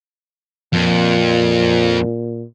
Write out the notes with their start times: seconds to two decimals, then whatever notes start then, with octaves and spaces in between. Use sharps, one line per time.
0.73 F2 A#2